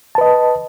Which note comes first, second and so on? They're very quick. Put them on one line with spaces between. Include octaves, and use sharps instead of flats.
A5 B4 D#5